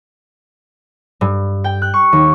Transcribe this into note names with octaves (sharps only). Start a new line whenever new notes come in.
G2
G5
F#6
C#6
D#2